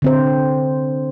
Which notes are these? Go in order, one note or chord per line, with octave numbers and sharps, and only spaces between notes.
D3 C4 C5